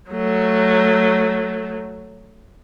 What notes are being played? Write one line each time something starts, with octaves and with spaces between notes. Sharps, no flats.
F#3 A3